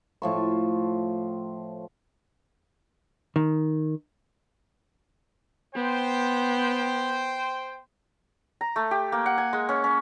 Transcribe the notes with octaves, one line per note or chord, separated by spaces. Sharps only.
A2 F3 C#6
D#3
B3 C5 G5
A#5
A3
G4
A#3
F#5
G#5
G#3
C#4
C#4